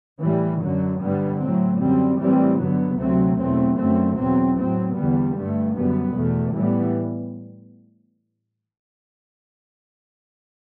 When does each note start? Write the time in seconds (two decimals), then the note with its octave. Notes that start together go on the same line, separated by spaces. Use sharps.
0.21 A2 E3 G3
0.61 F#2 D3 F#3
1.00 G2 D3 G3 B3
1.40 A2 F#3 C4
1.79 F#2 D3 G3 C4
2.19 A2 E3 G3 C4
2.58 G2 D3 F#3 B3
2.98 D2 C3 F#3 A3 C4
3.38 E2 B2 F#3 A3 C4
3.77 F#2 D3 A3 C4
4.17 E2 B2 F#3 C4
4.57 A2 F#3 C4
4.96 E2 D3 G3 B3
5.36 G2 D3 A3
5.74 F#2 D3 G3 B3
6.15 E2 B2 A3
6.54 A2 E3 G3 B3